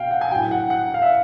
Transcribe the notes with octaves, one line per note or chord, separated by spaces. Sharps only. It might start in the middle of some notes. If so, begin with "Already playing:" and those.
Already playing: B2 F5 G5
F#5
G#5
A2 F#3 G5
F#5
F#5
F5
E5